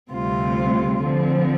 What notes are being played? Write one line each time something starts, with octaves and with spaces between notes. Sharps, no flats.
D2 C3 G3 C4 F4
D3 F3 C4